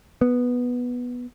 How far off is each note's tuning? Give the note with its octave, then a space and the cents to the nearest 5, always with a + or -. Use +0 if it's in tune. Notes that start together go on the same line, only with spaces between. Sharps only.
B3 -5